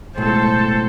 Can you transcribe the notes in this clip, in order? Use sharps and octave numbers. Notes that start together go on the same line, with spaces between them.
B1 A2 G#3 A4 C5